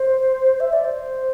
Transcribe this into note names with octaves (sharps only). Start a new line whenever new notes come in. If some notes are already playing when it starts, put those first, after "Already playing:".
Already playing: C5
E5
D5
C5